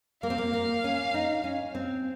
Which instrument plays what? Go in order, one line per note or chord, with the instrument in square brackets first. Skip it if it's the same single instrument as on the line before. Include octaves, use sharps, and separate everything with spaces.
[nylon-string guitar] A#3 [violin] F5
[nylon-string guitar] C4
A#3
A#3
C#4
D#4
C#4
C4